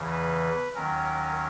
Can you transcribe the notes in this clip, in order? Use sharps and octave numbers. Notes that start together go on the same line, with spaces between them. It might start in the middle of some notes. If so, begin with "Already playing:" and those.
Already playing: E2 C#3 E3
B4
D#2 D#3 F#3 C#4 A#4